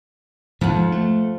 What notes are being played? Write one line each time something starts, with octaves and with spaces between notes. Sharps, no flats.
F2 G#2 F3 F#5
A3